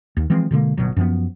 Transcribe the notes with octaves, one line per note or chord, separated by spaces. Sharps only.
D#2
E3 F3 G#3 C4
B2 D3 G#3 A#3
G1 C2 B2 F#3
F#2 F3 B3